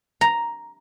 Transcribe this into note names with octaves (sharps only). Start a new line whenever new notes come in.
A#5